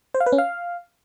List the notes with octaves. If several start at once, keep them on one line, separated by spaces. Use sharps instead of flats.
C5
F5
B4
C#4
F5